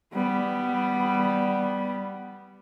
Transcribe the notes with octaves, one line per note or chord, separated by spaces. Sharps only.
G3 B3